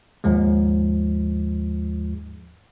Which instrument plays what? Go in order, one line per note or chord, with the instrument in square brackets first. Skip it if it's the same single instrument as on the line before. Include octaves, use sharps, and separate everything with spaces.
[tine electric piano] D#2 G#2 F3 G#3